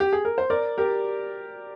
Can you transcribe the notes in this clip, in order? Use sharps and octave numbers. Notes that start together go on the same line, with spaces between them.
G4
G#4
A#4
C5
A#4 D5
G4 A#4